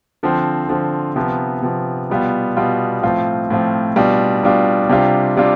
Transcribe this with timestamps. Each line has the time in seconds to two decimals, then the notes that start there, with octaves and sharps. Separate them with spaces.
0.23 D3 F3 C4
0.69 D3 F3 C4
1.16 C3 F3 B3
1.63 C3 F3 B3
2.10 B2 G3 B3 F4
2.57 B2 G3 B3 F4
3.02 A2 F3 C4 F4
3.50 A2 F3 C4 F4
3.96 B2 G3 D4 F4
4.43 B2 G3 D4 F4
4.89 C3 G3 D4 F4
5.37 C3 G3 D4 F4